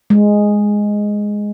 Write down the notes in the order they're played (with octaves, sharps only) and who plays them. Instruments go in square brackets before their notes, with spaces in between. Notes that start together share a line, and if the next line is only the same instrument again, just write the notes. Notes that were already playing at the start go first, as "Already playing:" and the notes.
[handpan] G#3